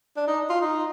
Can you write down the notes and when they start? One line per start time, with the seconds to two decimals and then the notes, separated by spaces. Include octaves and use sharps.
0.17 D4
0.28 D#4
0.50 F4
0.61 D#4